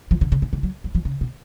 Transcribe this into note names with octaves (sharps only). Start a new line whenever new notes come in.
F3
D3
C#3
C#3
D3
F#3
F#3
F3
C#3
B2